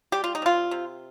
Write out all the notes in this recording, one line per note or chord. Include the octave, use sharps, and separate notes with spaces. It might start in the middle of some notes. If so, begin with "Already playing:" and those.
G3 G4
F4
D#4
C3 F4
C3